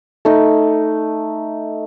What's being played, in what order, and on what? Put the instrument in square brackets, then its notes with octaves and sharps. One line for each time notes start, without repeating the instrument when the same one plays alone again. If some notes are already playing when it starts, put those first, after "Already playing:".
[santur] A3 D#4